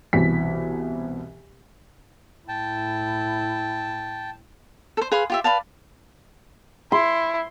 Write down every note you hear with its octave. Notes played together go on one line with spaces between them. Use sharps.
C2 B2 E3 B6
A2 E4 G5 A5
A4 C5
G#4 B4 F5 C6
F4 G4 E5
B4 D5 F5 A5
E4 C6